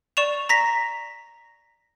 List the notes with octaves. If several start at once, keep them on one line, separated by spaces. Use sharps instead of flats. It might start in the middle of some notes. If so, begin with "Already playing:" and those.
D5 C#6 E7 F7
A#5 A#6 B6